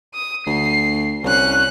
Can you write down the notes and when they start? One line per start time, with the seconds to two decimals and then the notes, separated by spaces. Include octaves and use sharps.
0.14 D#6
0.47 D2 C7
1.24 C2 C#4 F#6